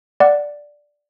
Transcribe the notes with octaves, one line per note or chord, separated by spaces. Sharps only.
D5 F#5